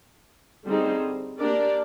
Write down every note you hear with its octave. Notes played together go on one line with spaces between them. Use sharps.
D3 G3 C4 D#4 G#4
A#3 D4 G4 A#4 D5